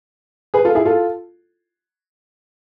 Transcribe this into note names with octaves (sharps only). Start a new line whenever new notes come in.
G#4 B4
F4 A4
E4 G#4
F4 A4